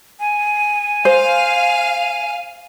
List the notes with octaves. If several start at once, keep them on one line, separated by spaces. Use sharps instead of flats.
G#5
C5 F5